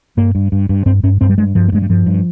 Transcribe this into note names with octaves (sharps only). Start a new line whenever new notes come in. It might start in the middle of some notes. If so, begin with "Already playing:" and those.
G2 A#3
G2
G2
G2
G2 C4
G2 C#4
G2 C4
G3
G2 G#3
G2 F3
A#3
G2 G#3
G3
G2 F3
G2